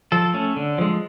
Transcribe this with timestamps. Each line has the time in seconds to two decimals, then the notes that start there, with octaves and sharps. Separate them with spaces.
0.12 F3 A4
0.33 A3 C#4
0.56 D3
0.78 F3 G#3